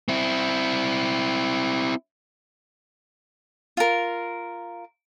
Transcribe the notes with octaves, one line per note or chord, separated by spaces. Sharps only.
C4 E4
F4 A#4